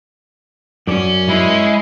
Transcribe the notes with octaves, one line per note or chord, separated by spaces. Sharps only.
F#2 C#4 D5
G#3 E4